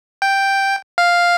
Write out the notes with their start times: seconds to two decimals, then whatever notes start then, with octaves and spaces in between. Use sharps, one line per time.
0.22 G5
0.98 F5